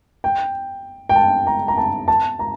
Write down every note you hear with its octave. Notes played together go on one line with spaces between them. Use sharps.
G5
G5
A5
A#5
A#5
A5
A5
A#5